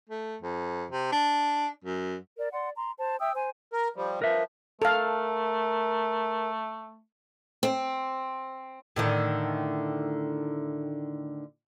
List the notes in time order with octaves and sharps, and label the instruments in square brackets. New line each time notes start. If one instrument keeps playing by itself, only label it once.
[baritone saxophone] A3
F2
C3
D4
F#2
[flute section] A#4 D5
D5 F#5 C6
A#5 C6
C5 A5
E5 G5 D#6 E6
C5 G#5
[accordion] A#4
F3 G3
[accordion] F3 [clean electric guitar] A#4 B4 E5
[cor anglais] A3 [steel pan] A4 F5 [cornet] A#4
[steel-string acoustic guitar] C4
[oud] A2 D3 D#3